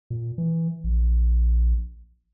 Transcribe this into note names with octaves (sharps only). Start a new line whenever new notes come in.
A#2
E3
A#1